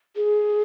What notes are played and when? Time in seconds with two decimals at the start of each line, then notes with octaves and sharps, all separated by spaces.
0.16 G#4